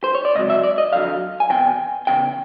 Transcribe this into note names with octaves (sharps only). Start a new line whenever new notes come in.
C5
C#5
D5
C#2 C3 F#3 D#5
E5
D5
D#5
F2 D3 F#3 F5
G#5
E2 C3 G5
E2 C#3 G5